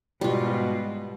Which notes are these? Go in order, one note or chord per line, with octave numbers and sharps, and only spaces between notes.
G#2 B2 G3 F4